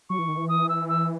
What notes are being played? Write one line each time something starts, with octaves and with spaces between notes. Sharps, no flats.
F#3 C#6
E3
D#3
E3
D#6
E6
E6